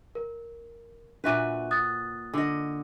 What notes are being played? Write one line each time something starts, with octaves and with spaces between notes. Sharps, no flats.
A#4
A#2 D4 F#4 B4 E5 D#7
D#6 F#6 A6
D3 D#5